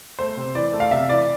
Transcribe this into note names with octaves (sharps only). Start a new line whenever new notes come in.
A3 C5
C3
E3 D5
A3
F5
C3 E5
E3 D5